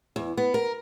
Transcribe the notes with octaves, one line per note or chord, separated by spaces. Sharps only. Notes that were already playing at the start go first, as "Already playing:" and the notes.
E2
B3
A#4